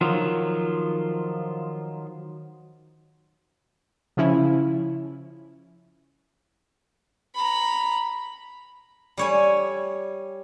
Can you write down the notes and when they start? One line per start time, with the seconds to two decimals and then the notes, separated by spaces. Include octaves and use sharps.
0.01 D#3 F3 F#3 F4
4.17 C#3 F3 C#4 E4
7.35 A#5 B5
9.17 G3 C#5 G#5